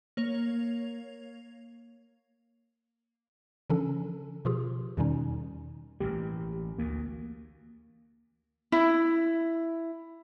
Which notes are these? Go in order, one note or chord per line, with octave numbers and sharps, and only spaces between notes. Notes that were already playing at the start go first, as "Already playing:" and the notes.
A#3 C#5 F7
C#3 E3 F3 C#4 D4 A4
B2 F3 F4 G4 G#4
E2 B2 D#3 G3 C#4 D#4
A1 E3 A#3 G4
D2 A#3
E4